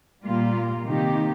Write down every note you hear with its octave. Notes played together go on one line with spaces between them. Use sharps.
A#2 G3 A#3 F4
C3 D#3 A#3 D#4 G4